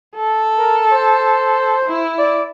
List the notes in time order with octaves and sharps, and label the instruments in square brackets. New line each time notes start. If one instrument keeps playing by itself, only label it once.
[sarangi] A4
[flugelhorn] A#4
C5
[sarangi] E4
[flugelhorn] D5